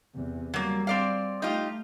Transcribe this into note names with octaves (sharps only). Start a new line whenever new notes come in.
E2 C3
F#3 G3 A#3
C4 D5 F5
A3 D#4 F4 G4